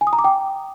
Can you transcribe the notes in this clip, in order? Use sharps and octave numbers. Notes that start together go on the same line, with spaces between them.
G#5
D#6
A#5
D6
G5